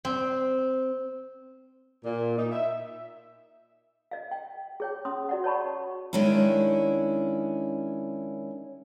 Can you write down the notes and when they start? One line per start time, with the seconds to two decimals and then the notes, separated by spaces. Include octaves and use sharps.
0.05 C4
2.04 A#2
2.38 D#4
2.52 E5
4.11 D#5 F5
4.31 G5
4.80 G#4 C#5 G5
5.05 C#4 C6 D#6
5.29 F#4 D5 F#5
5.44 C#5 D#5 A5 B5 C#6
6.13 D#3 G#3 C#4 D4 E4